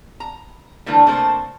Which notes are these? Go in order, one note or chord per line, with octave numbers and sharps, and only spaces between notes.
A#5
D3 E3 F3 A3 A#3 D4
C3 A3 A#3 A4 C5